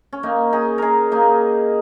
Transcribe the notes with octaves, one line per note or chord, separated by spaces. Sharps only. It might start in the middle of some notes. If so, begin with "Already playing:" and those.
C#4
A#3 D#4
D#4 G#4
D#4 G#4 A#4
A#3 D#4